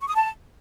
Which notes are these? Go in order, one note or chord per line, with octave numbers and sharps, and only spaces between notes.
C#6
D#6
A5